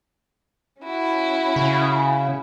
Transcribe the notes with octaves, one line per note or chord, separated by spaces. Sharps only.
C#4 E4 F#4
C#3